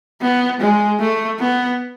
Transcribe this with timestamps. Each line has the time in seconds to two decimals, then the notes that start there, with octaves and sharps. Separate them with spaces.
0.22 B3
0.60 G#3
1.00 A3
1.40 B3